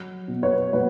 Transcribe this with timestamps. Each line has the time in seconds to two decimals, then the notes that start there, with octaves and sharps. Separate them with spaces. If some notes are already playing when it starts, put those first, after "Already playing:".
Already playing: F#3
0.28 B2
0.43 B4 C#5
0.73 F#3 B4 C#5